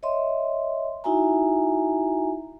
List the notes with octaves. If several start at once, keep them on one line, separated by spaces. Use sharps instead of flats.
C#5 D#5 E5 C6
D#4 E4 F#4 E5 G#5 A#5